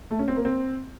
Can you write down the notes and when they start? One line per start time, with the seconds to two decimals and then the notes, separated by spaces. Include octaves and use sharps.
0.11 A3
0.19 C#4
0.28 C4
0.36 A#3
0.45 C4